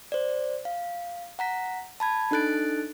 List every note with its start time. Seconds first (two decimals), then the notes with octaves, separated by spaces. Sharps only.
0.12 C5 D5
0.65 F5
1.39 F#5 A#5 B6
2.00 A5 B5 G#6
2.31 D4 D#4 A4 F#6 A6 D7